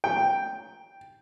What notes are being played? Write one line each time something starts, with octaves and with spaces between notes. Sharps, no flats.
G5